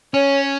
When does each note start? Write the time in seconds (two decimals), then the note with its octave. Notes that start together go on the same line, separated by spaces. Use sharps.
0.13 C#4 C#5